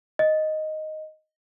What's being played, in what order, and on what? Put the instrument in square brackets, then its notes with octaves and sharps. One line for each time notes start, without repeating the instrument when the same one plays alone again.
[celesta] D#5